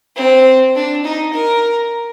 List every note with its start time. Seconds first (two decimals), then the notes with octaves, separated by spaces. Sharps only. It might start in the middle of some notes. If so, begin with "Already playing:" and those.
0.16 C4
0.75 D4
1.04 D#4
1.33 A#4